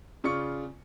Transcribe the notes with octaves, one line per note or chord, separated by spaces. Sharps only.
C#3 F4 D5 C#6 C#7